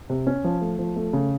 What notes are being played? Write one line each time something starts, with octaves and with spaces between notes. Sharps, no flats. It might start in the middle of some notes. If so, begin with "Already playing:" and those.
C3
C#4
F3
A3
F3
A3
C#3